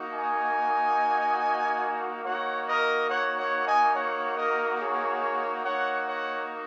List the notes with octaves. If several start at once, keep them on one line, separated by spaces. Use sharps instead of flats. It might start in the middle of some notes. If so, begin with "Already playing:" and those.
Already playing: A#3 D#4 F#4
D#5 G#5
A#3 D#4 F#4 C#5 F#5
A#4 D#5
C#5 F#5
C#5 F#5
D#5 G#5
C#5 F#5
A#4 D#5
G#4 C#5
A#3 D#4 F#4 C#5 F#5
C#5 F#5